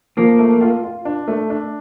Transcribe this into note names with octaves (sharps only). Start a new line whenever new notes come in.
F3 A#3
A3
F4
F4
D4
A3
D4